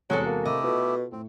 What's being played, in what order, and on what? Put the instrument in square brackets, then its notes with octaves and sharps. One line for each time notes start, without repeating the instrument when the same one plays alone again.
[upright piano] E2 C3 [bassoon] F#3 [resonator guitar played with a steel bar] G#3 F#4 A4
[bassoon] A#3
[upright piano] C3 [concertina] A3 E4 G4 [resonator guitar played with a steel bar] D#5
[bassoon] B2 [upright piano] F4 A4
[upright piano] A2 [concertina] C4